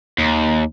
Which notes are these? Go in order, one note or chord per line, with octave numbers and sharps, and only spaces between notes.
D#2